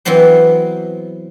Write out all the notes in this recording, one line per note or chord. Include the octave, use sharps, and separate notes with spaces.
E3 F#3 B3 C4 C5